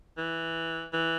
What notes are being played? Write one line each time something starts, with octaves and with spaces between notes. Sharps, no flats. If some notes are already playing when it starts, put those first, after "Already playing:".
E3
E3